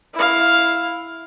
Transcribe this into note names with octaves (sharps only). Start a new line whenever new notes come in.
E4 F5